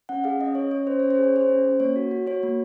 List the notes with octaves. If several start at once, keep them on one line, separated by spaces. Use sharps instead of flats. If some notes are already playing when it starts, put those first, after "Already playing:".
C#4 F#5
G#4 F5
C#4 D#5
C#4 C#5
C#4 C#5
C#4 C5
C#4 C#5
C5
G#4
C#5
G#4 C5
C#4
C#4
A#3 C#5
F#4
F#4
F#4 C#5
A#3